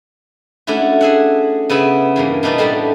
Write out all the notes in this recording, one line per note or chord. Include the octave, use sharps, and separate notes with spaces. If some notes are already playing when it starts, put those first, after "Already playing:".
A3 C#4 D4 E4 F#4
G#4 E5 F#5
C#3 B3 E5 B5
E2 G2 A#3
B2 D4 D#4 B4 D5
A2 G3 A3 F#5 A5